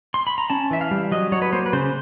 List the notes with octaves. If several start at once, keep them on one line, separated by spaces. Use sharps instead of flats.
C6
B5
A#5
C#4 A5
E3 E5
F5
G3
F#3 D#5
F#3 C#5
B4
A#3 C5
B4
C#3 C5